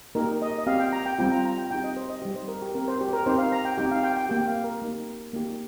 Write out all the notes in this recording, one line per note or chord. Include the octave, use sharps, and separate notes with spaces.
A#3 D#4 G4 A#4
D#5
D#5
C4 G4 F5
G5
A#5
G5
G3 C4 F4 G5
A#5
A#5
G5
C4 D#4 G4 G5
D#5
C5
D#5
G3 D#4 G4 D#5
C5
A#4
G4
C4 G4 A#4
C5
G4
A#4
C4 D#4 G4 C5
F5
A#5
G5
C4 D#4 G4 G5
F5
G5
G5
A#3 G4 G5
G5
F5
A#4
A#3 D#4 G4
A#3 D#4 G4